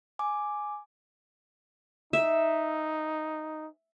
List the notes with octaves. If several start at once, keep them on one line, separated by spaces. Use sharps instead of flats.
G#5 D6
D#4 E5